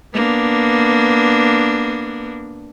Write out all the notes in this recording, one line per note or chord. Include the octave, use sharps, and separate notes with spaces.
A#3 B3 D4